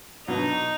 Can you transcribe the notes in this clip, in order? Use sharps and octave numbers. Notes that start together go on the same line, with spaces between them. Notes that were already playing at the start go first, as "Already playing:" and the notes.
B2 F#3 B3 D4 D#4